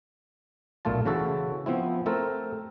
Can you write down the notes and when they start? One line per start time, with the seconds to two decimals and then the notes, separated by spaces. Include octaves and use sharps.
0.85 B1 A#2 A3 F4 A5
1.06 C#3 E3 F#4 A4
1.66 F3 B3 C4 E4
2.06 A3 C4 A4 A#4